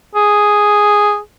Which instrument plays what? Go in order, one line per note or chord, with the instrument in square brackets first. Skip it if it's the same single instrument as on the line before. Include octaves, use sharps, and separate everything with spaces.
[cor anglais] G#4